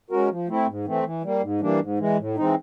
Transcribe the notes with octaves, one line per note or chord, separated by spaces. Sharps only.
G#3 C#4 F#4 A#4
F3
A3 C4 E4
G#2
E3 A3 C4
E3
G3 A#3
G#2
E3 G3 A#3 D4
G#2
E3 G#3
A2
E3 G#3 C4 D#4